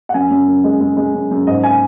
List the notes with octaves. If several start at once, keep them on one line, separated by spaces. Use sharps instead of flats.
F#5
F#2 G#5
F#2
F#2
G#3
G#3
G#3
F#2
F#2
G#2 D#5
G#5